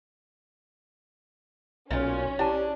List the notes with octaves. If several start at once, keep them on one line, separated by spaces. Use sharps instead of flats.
B1 A#2 C#4 F4
D4 E4 G4 A5